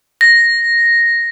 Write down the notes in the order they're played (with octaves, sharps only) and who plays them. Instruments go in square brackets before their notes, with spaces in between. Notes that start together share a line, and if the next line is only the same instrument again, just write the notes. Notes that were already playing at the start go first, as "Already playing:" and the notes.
[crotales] A#6